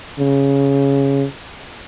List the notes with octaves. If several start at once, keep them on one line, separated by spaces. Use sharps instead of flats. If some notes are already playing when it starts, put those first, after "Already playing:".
C#3